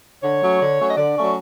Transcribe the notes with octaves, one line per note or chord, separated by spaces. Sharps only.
D3 C#5
F#3 A3 C#4
D3
F#3 A3 C#4
D#5
D3 D5
F#3 A3 C#4